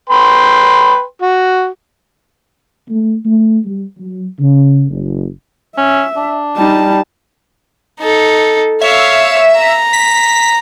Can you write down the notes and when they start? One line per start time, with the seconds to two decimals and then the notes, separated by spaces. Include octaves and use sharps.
0.09 B4 G5 C6
1.22 F#4
2.89 A3
3.26 A3
3.65 G3
3.98 F#3
4.40 C#3
4.90 F#1
5.77 C#4 E5
6.17 D4
6.57 G3 D#4 A5
8.00 D#4 A4
8.81 C#5 E5 F5
9.56 A#5
9.93 B6